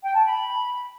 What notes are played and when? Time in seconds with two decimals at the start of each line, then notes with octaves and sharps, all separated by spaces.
0.02 G5
0.14 A5
0.25 B5